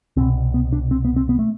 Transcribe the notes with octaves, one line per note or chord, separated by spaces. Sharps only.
C2 B2 C4
B3
D4
C4
B3
C4
B3
A3